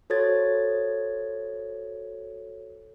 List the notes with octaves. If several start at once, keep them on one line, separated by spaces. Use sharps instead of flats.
F#4 A4 C5 C#5 G#6 A6